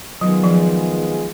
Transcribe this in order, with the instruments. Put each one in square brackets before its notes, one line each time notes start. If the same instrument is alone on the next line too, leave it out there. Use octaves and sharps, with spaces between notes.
[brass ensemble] D#3 G#3 B3 F4 G#4 [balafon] F#3
[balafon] F3